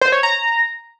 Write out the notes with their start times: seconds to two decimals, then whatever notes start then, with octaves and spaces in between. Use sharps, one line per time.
0.01 C5
0.12 C#5
0.23 A#5